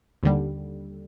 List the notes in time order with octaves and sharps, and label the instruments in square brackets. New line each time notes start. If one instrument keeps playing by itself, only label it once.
[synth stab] D#2 D3 G3